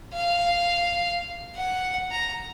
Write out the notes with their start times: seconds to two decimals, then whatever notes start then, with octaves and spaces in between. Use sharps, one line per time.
0.13 F5
1.55 F#5
2.11 A#5